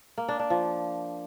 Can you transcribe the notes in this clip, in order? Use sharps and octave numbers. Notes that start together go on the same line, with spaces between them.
A#3
D4
D4
F3